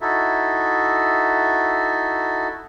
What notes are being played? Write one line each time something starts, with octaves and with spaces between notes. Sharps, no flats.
D#4 E4 F#4 A4 E5